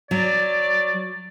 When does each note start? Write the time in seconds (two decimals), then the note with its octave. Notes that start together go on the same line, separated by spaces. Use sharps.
0.11 F#3 D5